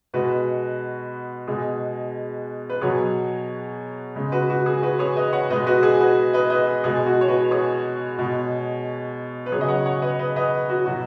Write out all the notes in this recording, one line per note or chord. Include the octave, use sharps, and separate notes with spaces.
B2 G#3 F#4 B4
B2 G#3 G#4
B4
B2 F#3 G#4 C#5
C#3 G#3
F#4 B4
F#4
G#4
F#4 B4
G#4 C#5
B4 D#5
C#5 F#5
B2 G#3 B4 D#5
F#4 B4
G#4
F#4 B4
B4 D#5
B4 D#5
G#4
B2 G#3 G#4
F#4
C#5
F#4 B4
G#4 C#5
B2 G#3
B4
C#3 F#3 G#4 C#5
D#5
C#5 F#5
C#5 F#5
B4 D#5
B4 D#5
B4 D#5
F#4
B2 F#3 F#4